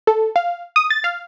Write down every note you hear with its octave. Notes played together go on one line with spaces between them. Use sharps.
A4
F5
D#6
A6
F5